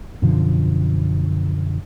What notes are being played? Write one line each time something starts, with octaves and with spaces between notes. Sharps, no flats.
F#2 B2 D3 F3